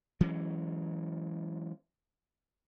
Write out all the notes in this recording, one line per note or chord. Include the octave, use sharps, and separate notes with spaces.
E3 F#3 G#3 C#4